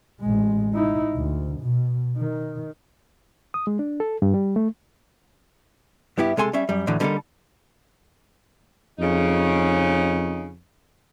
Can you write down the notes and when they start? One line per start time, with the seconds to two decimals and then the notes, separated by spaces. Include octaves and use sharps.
0.20 A1 G#3
0.74 D#4 E4
1.16 D2
1.61 B2
2.17 D#3
3.54 D#6
3.67 G#3
3.79 D4
4.00 A4
4.22 G2
4.34 G3
4.56 A3
6.18 G2 B3 E4 G4
6.37 C3 G#3 A4 G#5 C6
6.53 G3 C#4 E5
6.69 F#2 G3
6.87 A2 D3 E3 F#3
7.00 D3 G3 A#3 D4 D#4 A4
8.99 F2 C#3 D#4